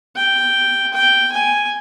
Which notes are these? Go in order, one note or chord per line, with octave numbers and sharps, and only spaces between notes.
G5
G5
G#5